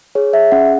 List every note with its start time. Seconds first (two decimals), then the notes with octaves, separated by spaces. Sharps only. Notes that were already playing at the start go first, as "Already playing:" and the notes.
0.15 G#4 C#5
0.33 G#4 E5
0.52 C#4 F#5